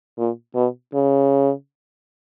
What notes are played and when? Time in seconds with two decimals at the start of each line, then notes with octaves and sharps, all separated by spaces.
0.18 A#2
0.55 B2
0.94 C#3